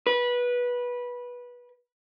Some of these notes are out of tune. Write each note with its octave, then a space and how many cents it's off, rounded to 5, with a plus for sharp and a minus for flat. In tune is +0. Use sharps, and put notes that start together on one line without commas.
B4 -15